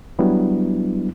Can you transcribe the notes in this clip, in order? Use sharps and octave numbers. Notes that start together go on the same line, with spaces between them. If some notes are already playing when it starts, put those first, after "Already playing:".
F#3 G3 B3 D4 E4